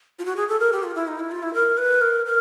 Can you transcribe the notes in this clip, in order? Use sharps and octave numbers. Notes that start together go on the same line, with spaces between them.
F4
F#4
G#4
A4
A#4
G4
F4
E4
D#4
E4
F4
E4
A#4
B4
A#4
A#4